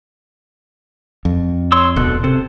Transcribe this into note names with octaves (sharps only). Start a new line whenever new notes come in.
F2
C#5 C6 E6
D1 B2 A4 F#6
C3 A4 C5